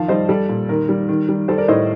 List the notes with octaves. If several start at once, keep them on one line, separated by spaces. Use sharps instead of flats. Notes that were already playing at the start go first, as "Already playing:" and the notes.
Already playing: D#3 F3 F5 A5
G3 C5 D#5
G3 A4
A#2
D#3 A#4
G3
D#3
G3
G3 A4 C5
A#4 D5
A2 C5 D#5